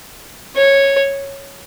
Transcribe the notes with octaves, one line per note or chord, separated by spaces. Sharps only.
C#5